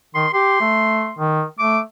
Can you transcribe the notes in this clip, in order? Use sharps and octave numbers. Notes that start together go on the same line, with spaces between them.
D#3 C6
G4 C6
A3
D#3
A3 D6